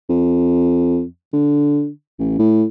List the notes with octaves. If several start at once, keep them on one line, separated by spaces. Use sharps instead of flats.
F2
D3
A1
A2